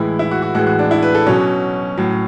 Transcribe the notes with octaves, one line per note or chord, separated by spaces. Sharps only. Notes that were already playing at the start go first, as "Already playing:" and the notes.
Already playing: A2 E3 G#3 E4
E4
F#4
F#4
A2 E3 G#3 F#4
F#4
D4
E4
B4
A4
B2 F#3 C#4
A2 F#3